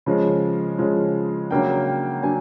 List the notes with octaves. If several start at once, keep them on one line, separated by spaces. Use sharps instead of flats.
C#3 F3 G#3
C#3 F3 G#3
C#3 F#3 A#3 D4 G5
G5
F#3 A#3 D4 G#5